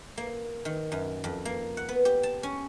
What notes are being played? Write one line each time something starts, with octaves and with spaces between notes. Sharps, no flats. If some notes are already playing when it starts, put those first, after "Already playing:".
A#3
D#3
F#2
F2
A#3
F#5
B3
G4
A5
C#4